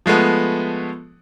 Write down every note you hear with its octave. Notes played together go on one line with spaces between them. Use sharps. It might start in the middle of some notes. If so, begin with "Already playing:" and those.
F3 G#3 A3 B3